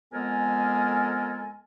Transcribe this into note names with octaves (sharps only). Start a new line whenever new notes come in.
F2 G#3 B3 A4 A#4 G#5